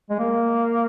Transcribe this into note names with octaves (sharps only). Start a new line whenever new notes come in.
G#3
A#3